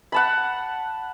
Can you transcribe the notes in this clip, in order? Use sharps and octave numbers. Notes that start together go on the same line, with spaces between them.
F#5 A5 B5